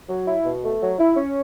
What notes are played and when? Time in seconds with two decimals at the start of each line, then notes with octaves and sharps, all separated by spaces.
0.09 F#3
0.27 E4
0.45 B2
0.63 A3
0.81 F#3
0.99 E4
1.17 C#4